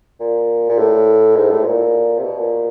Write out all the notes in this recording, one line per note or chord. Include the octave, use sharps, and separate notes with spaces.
A#2
A#2
A2
G#2
A2
A#2
C3
B2
A#2